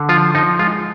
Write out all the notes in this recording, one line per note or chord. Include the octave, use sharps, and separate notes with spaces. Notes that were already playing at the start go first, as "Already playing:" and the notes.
Already playing: D3
F3 F4
F3 D#4
G#3 F4